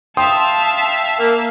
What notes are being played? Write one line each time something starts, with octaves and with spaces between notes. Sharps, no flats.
E5 F5 G5 A5 C6 D#6
A#3